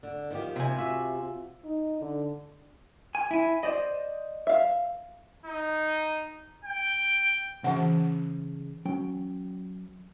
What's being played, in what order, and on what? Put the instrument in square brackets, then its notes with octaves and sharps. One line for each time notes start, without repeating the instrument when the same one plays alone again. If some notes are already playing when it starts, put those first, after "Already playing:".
[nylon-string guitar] D3
D#3 F3 G4
[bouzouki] C3 G#5
[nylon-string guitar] F4 F#4 E5
[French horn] D#4
D3
[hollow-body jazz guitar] G#5
E4 G#5
C5 D5 D#5
[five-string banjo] E5 F5
[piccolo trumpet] D#4
G5
[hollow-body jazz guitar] C#3 E5 A5 [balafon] E3 F#5
[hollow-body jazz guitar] F#3 C#4 G5